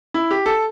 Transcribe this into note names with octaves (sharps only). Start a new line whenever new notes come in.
E4
G4
A4